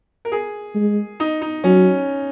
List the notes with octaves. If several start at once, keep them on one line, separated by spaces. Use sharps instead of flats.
A#4
G#4
G#3
D#4
D#4
F#3 C#4